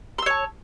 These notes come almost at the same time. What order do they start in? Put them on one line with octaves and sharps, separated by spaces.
C6 E6 C#5 A5